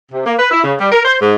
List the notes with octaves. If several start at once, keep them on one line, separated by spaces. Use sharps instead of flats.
C3
A#3
B4
E4
C#3
G3
A#4
C5
G#2